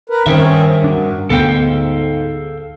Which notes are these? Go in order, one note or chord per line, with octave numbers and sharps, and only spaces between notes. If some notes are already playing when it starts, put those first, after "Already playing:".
A#4 B4
G2 D#3 C4 C#4 G#4 A#4 E5
F#3 D4
D2 G#2 B3 A4 F5 G5